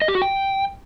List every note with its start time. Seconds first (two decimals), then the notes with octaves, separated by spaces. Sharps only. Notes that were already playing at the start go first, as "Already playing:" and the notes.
0.02 D#5
0.08 G4
0.15 F#4
0.22 G5